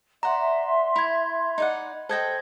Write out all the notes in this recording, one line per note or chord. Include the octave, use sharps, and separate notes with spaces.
D5 E5 F#5 A#5 C6
E4 B5 G#6
D#4 D5 F#5
A4 C5 D#5 G5 G#6 A#6